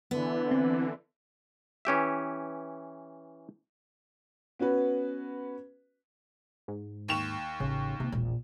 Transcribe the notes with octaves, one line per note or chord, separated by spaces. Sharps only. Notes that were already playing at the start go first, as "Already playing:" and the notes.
D3 E3 B3
C4
E3 C#4 G4 E5
B3 C#4 F#4 B4
G#2
D#2 C#6 E7
A1 C#3
C3 A#3
E1 A#1